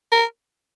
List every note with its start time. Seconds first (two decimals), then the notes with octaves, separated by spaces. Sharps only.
0.12 A#4